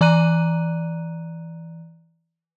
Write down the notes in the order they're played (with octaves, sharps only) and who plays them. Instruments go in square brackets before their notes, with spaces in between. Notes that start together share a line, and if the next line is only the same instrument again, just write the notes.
[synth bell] E3 D5 A#5 F#6 D#7